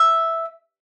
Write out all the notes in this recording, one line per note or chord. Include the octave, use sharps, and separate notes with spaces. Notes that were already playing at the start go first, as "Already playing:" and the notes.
Already playing: E5